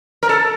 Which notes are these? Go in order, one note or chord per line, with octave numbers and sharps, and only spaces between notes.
A#4
A4